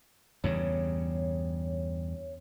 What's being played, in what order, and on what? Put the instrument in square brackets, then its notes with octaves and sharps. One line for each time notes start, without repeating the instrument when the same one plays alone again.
[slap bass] E2 G2 C#3 [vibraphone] C#5